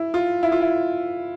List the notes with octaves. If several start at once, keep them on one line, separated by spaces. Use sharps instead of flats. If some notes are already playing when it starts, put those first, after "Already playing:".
Already playing: E4
F4
E4
F4
E4